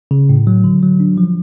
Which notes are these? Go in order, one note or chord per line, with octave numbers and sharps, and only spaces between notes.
C#3
A2
F#3
D3
F#3
D4
F3